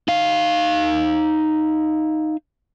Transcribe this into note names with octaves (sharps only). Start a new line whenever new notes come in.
D#4 F5